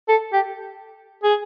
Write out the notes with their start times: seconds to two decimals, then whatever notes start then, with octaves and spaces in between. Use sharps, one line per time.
0.09 A4
0.32 G4
1.23 G#4